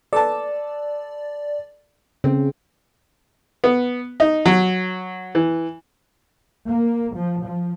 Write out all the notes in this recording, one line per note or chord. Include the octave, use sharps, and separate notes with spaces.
A4 B4 D5 A5
C#3 C4
B3
D#4
F#3
E3
A#3
F3
F3